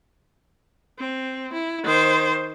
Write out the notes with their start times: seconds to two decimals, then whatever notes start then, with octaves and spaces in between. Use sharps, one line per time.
0.98 C4
1.53 E4
1.83 D#3 C5